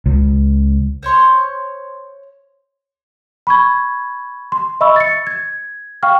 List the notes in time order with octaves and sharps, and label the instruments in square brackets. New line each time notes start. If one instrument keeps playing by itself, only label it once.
[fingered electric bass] C#2
[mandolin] C5 C#5 C6 C#6
[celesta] B5 C#6 G#6
C6
D#5 E5 B5 C#6 E6
A6 C#7
G#6
F5 G5 C#6 F6